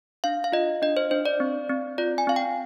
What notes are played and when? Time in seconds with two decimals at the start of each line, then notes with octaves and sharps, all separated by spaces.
0.24 D4 F5
0.44 F5
0.52 F4 D#5
0.82 D4 D#5
0.97 C5
1.11 D4 C5
1.26 D5
1.40 C4
1.69 C4
1.98 F4 D5
2.18 G#5
2.27 C4 F5
2.36 G5